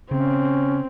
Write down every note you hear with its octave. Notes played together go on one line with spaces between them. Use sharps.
C#3 C4 C#4